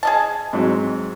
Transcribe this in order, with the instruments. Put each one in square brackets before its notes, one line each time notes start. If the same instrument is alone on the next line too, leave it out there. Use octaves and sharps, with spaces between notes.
[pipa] G#4 D#5 A5
[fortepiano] G#2 F#3 C4